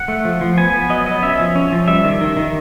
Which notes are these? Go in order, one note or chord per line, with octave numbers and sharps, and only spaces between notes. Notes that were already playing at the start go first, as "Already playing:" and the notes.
Already playing: F#5
A3
F3
F3
B3 G#5
B3
F#3 D#5
B3 D#5
C#4 E5
F3
C#4
F3
G3 E5
D#3
D#3
D#3